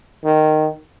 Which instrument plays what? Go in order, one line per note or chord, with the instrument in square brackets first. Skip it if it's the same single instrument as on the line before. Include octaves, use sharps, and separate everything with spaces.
[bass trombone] D#3